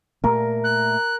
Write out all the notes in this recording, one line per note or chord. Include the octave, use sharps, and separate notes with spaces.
A#2 A3 A#3 A#4
F#6